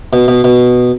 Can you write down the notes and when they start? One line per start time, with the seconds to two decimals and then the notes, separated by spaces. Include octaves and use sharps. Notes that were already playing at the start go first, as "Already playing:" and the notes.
0.13 B2
0.28 B2
0.44 B2